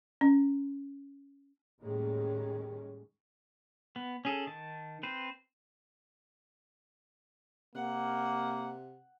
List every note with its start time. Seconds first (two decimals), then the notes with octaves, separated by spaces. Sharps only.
0.21 C#4
1.80 D#2 A2 D#3 G3 G#3 C#4
3.96 B3
4.25 C#4 G#4 A4
4.47 D#3 A5
5.03 C4 B4 C5
7.75 C3 A#3 F#5